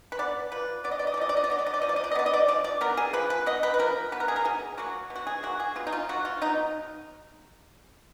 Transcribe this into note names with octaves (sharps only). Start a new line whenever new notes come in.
B4
B3 D5
F3 B4
B3 D5
D#5
D5
D#5
D5
F3 D#5
D5
D#5
D5
B3 D#5
D5
D#5
D5
F3 D#5
D5
D#5
D5
D#5
B3 D5
D#5
D5
F3 D5
D5
B3 A#4
G#4
F3 B4
B4
B3 D#5
B4
B4
F3 A#4
B3 B4
A#4
G#4
A#4
B2 G#4
F#3 A#3 F#4
B2
F#4
G#4
F#3 A#3 F#4
G#4
B2 F4
D#4
F4
F#3 A#3 F#4
F4
B2 D#4